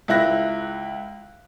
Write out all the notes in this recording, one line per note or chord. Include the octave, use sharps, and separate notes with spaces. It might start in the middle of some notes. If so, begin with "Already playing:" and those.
C#2 E4 F#6 A#6